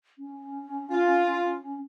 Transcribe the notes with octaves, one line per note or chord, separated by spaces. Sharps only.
C#4
F4